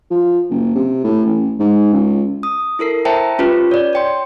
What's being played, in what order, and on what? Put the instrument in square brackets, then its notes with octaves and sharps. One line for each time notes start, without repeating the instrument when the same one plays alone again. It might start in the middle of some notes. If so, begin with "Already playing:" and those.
[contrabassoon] F3
F#1
C3
A2
A1
G#2
C#2
[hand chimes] D#6
E4 A4 A#4 C7
C5 E5 G5 A5 A#5
C#4 F4 G4 B4
C#5 D5
C#5 G5 C6